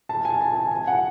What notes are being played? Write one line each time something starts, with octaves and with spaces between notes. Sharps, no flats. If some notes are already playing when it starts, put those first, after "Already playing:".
A5
G#5
A5
G#5
G#5
F#5